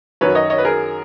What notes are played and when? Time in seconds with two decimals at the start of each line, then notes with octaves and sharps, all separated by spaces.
0.21 F#2 D#3 F#3 B4 C#5
0.35 C#5 D#5
0.50 C#5 D#5
0.58 B4
0.65 G#4 A#4